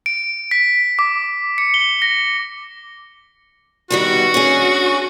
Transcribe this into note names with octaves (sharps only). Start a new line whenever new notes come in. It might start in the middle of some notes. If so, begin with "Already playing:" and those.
D7
B6
D6
C#7
G7
A#6
D#3 G3 B3 F#4
C#4 D4 G#4